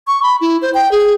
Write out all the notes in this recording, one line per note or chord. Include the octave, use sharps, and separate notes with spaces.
C#6
B5
E4
C5
G5
G#4